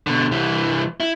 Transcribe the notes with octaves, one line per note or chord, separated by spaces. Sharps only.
B2 D3
C2 E3
E4